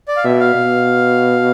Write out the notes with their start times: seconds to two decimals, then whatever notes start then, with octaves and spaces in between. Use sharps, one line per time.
0.08 D5
0.17 F5
0.24 B2 E5
0.40 F5
0.55 B2